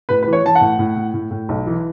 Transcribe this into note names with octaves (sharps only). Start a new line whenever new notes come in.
A2 B4
E3 B4
C#5
E3 A5
F#5
A2
A2
A2
A2
A2
B1
E3